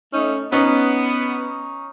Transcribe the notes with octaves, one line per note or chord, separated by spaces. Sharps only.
A3 C#4 D#4
B3 C#4 D#4